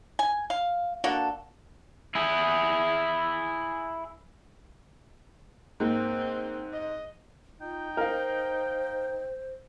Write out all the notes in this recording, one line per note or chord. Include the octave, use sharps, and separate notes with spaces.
G#5
F5
A#3 D4 F#4 A4
E4 G#4
G#2 A#3 C4
D#5
D#4 F4 G5
A#4 C5 F5